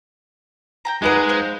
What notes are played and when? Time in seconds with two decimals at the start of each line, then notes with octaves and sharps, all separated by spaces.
0.85 G5 G#5 A#5
1.02 G#3 D#4 B4 D5 F#5 A#5
1.29 C5 F5